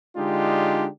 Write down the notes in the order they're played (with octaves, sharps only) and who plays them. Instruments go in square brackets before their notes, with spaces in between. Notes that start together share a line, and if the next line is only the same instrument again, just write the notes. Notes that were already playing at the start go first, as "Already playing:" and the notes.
[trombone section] D3 G#3 D4 D#4 F4 G4